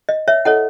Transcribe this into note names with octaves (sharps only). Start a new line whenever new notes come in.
D#5
C#5 E5
E4 A4 C#5 D#5 F#5